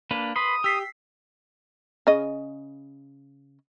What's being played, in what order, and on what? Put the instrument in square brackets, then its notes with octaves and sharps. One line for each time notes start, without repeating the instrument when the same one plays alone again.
[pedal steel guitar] A#3 D4 B4
[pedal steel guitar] B4 B5 C6 [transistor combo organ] D#6
[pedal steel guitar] G4 [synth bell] E6 B6 C7
[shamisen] C#3 D#5